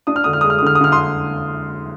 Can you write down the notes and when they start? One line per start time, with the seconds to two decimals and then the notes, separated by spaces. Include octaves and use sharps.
0.07 D4 D#6
0.16 F6
0.24 D3 D#6
0.33 F6
0.41 G#3 D#6
0.50 F6
0.58 D#6
0.62 D3 F6
0.75 D#6
0.81 D3 F6
0.92 C6 D#6